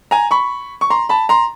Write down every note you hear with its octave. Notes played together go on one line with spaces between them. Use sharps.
G#5 A#5
B5 C#6
C#6
A#5 C6
A5 B5
A#5 C6